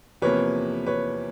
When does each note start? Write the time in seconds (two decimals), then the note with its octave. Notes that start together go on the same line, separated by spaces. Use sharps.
0.22 E2 C3 F3 A#3 B4 C#5
0.86 B4 C#5